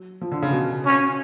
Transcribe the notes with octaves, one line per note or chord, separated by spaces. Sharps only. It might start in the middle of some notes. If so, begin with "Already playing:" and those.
Already playing: F#3
F3
D3
C#3
B2
C#4